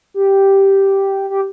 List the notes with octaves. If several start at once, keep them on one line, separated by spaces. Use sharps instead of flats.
G4
G4